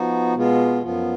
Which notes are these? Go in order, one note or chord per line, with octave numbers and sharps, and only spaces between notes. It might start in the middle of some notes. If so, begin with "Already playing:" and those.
Already playing: F3 B3 D#4 F#4
B2 G#3 B3 F4
F#2 F3 B3 F4